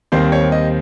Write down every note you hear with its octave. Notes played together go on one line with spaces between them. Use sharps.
D#2 D#3 G3 C4 C5
C#5
D#5